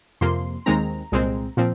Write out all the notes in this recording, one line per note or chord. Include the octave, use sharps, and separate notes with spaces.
F2 C3 F3 A#3 C6
D#2 D#3 G#3 C4 A#5
C2 A#2 G#3 C4
A#2 F3 C4